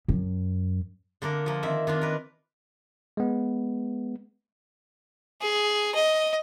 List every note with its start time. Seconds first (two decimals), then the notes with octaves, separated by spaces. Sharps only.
0.08 F#2
1.22 D3 A#3 D4 A#4
1.46 F3 A#3
1.63 D#3 C4 E5
1.87 D#3 D4 F4
2.01 A#4 B4
3.17 G#3 B3
5.41 G#4
5.95 D#5